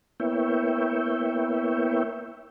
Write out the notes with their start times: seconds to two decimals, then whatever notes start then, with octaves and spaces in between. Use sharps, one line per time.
0.20 A#3 B3 E4 C#5 E5 G5